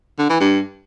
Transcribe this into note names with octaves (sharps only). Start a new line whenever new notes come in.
D3
E3
G2